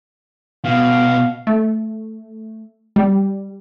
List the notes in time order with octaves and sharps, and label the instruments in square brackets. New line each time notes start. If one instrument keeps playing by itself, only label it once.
[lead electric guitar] B2 [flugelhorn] F5
[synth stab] A3
G3